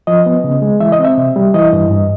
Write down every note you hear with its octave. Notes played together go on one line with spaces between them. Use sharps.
F3 D#5
B3
C#3
G#3
E3 E5
D#5
C4
E5
C3
G3
E3 D#5
G2
G2